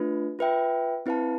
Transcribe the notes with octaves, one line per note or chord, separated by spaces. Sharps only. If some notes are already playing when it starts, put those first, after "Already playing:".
Already playing: A3 D4 F4 B4
F4 B4 E5 G5
C4 E4 B4 F5 A5